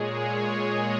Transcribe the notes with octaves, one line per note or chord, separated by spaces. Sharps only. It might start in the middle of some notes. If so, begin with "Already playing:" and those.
Already playing: A#2 G#3 G#4 C#5
D#5